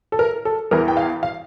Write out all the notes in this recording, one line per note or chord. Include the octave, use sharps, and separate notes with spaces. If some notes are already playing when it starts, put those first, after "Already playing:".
A4
A#4
A4
E2 E3 A#4
G5
F5
F5